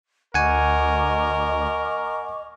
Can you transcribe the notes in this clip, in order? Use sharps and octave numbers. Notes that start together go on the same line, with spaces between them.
D2 A#4 D#5 F#5 G#5 C#6 D6